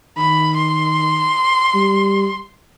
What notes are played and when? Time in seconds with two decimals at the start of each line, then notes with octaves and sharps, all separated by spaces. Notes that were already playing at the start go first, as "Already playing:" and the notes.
0.18 D#3 B5
0.57 C6
1.74 G3